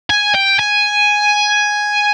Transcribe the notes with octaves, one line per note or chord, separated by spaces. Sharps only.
G#5
G5
G#5